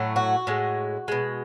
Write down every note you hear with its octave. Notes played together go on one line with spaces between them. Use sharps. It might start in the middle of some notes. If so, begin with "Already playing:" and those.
Already playing: A2 F#3 A3
F#4
A2 G#3
B2 G#3